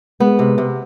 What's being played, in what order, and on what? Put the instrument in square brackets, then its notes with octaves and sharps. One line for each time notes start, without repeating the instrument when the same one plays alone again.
[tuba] G#3 [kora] B3
[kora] C3
C3